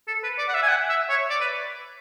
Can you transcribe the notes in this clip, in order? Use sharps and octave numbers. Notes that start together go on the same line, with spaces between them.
A4
B4
D5
F#5
E5
G#5
F#5
E5
C#5
D5
B4